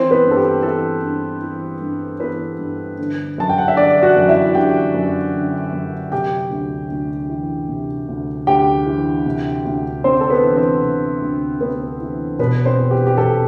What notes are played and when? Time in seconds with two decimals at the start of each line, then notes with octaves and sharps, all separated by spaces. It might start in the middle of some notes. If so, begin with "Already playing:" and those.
Already playing: E3 C4 C5
0.11 B3 B4
0.25 G2
0.31 A4
0.37 G4
0.63 E3 A4
1.02 G2
1.42 E3
1.81 G2
2.20 E3 B3 B4
2.59 G2
2.99 D3
3.38 F#2 A5
3.49 G5
3.58 F#5
3.68 E5
3.77 D3 D4 D5
4.03 F#4 F#5
4.16 F#2
4.29 E4 E5
4.55 D3 G4 G5
4.94 F#2
5.34 D3
5.72 F#2
6.12 C3 G4 G5
6.51 D2
6.90 D2
7.29 E3
7.69 C3
8.08 D2
8.47 D2 G4 G5
8.86 E3
9.26 C3
9.65 D2
10.04 D2 C4 C5
10.21 A4
10.30 B3 B4
10.43 E3
10.56 C4 C5
10.83 C3
11.22 D2
11.61 D2 B3 B4
12.00 E3
12.39 B2 B3 B4
12.66 C4 C5
12.78 E2
12.91 G4
13.07 G4
13.17 B2 A4